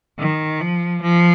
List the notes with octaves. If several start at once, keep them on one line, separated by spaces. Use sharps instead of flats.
D#3
F3
F3